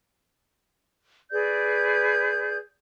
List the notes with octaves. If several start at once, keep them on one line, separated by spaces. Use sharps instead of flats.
G#4 B4 D5 G6